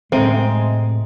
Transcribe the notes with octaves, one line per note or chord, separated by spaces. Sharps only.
A2 C3 G#3 C4 A4 E5 A#5